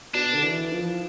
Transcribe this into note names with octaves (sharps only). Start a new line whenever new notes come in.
B2 D4
D3
E3
F3